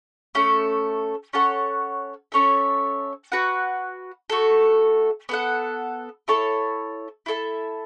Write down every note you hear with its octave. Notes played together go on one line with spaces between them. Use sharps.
A3 C#4 A4
C#4 A4 C#5 F#5
C#4 A4 C#5 E5
F#4 B4 F#5
A3 F#4 A4
B3 A4 F#5
E4 A4 C#5 A5
E4 A4 E5 A5